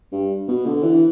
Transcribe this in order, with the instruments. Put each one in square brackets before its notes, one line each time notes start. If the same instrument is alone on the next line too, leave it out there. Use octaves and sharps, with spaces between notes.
[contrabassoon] G2
B2
D3
E3